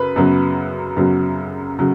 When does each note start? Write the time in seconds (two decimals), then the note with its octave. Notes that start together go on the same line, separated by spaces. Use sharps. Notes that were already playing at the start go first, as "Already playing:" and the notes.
Already playing: F#2 C#3 B4
0.16 F#2 C#3 F#3 B3
0.97 F#2 C#3 F#3 B3
1.79 C#3 F#3